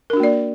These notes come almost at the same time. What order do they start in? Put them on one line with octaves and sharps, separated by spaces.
A#4 D4 F#4 A#3 D5